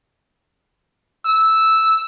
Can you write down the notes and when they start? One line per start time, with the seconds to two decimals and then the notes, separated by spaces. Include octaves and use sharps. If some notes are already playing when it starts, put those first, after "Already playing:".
1.26 E6